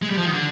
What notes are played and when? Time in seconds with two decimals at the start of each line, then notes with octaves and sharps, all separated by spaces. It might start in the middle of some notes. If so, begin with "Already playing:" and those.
0.03 G#3
0.10 G3
0.17 F3
0.25 D#3
0.33 D3